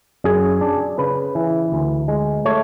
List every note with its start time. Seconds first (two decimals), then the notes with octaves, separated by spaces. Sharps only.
0.24 F#2 G#4
0.61 D4
0.98 C#3 B4
1.35 E3
1.72 D2
2.08 G#3
2.46 A3 C#5